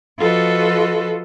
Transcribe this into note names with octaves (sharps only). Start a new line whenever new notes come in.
F3 F4 F#4 A4 B4 D#5